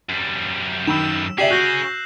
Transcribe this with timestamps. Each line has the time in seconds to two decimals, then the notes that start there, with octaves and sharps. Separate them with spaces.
0.09 F#2 G3
0.87 D#3 B5 E6 E7
1.38 C#4 G4 G#4 D5 E5 C7 E7 F#7
1.51 F#4 F#6 G6 A#6